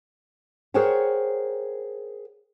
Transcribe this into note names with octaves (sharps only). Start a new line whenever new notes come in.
G#4 A#4 C5 C#5 F#5 G5